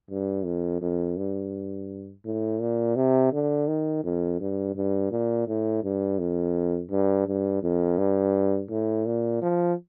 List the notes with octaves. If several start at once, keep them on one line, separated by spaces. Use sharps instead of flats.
G2
F2
F2
G2
A2
A#2
C3
D3
D#3
F2
G2
G2
A#2
A2
G2
F2
G2
G2
F2
G2
A2
A#2
F3